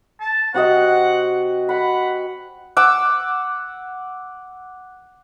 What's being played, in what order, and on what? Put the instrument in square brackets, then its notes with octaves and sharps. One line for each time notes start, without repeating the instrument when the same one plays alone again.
[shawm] A5
[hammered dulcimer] C3 F#4 D#5 [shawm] F#5
[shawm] F#5 [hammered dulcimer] B5
[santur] F#5 D6 E6